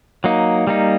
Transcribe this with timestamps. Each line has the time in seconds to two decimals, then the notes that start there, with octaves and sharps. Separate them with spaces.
0.24 F#3 A#3 D#4
0.67 G3 A#3 D#4